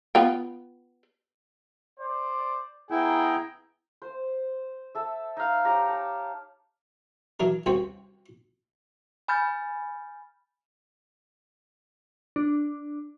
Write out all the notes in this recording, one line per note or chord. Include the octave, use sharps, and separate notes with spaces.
B3 F4 G5
C5 D5
B3 E4 G#4 G5 A#5
C5
A4 E5
D#4 F5
G4 C#5 A#5
A5
E3 F#3 D4 A#4
C2 C4 C#4 F#4 C5 G5
G#5 B5 F6 G6 A6
D4